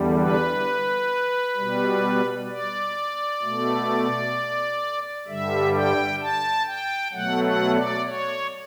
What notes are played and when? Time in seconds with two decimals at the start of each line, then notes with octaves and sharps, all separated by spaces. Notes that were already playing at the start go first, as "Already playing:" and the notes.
Already playing: E2 D3 G3
0.18 B4
1.56 B2 G3
2.49 D5
3.42 B2 A3
5.27 G2 D3 G3 E5
5.74 G5
6.21 A5
6.66 G5
7.13 B2 F#3 A3 F#5
7.44 F#5
7.74 D5
8.05 C#5